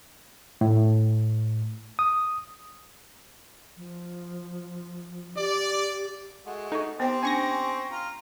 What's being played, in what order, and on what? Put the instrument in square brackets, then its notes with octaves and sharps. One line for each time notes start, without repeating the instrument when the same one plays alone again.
[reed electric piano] A2
D#6
[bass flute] F3
[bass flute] G4 [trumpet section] D5
[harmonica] G#3 A3 F#4
[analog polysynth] D#4 [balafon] A4 C#6
[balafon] B3 C5 G5 [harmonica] C4 G4
[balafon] C#4 D4 [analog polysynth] G#5 C#6 A#6
[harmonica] F4 A#5